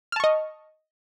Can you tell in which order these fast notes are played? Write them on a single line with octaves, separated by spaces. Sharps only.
F6 A5 C#6 D#5